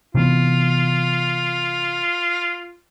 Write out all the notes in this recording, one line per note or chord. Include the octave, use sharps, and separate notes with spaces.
C3 E3 B3 F4